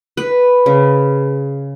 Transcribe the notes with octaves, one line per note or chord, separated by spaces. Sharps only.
B4
C#3